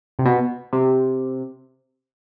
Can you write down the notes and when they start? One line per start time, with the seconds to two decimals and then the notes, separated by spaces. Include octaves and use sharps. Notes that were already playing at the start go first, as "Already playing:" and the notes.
0.19 C3
0.26 B2
0.73 C3